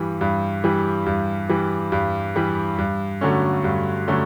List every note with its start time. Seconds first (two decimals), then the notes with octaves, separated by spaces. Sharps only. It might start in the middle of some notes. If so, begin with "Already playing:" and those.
Already playing: G2 E3 G3
0.21 G2
0.64 E3 G3
1.06 G2
1.49 E3 G3
1.92 G2
2.36 E3 G3
2.78 G2
3.21 D3 F#3 A3 C#4
3.64 G2
4.08 D3 F#3 A3 C#4